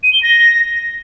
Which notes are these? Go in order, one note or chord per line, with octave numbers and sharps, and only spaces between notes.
D#7
G7
A#6